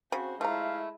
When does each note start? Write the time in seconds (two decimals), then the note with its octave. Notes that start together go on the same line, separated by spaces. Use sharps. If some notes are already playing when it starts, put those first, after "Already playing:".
0.12 C#3 C4 F#4 C5
0.41 F3 G#3 A3 E4 F5 A#5